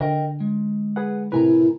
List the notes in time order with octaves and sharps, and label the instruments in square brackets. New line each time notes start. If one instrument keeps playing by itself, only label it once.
[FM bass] D3 [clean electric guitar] A#4 D#5 G5
[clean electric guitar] G#3
[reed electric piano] G#4 B4 F#5
[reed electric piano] A2 C3 B4 [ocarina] E4 [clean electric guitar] A#4 G#5 A#5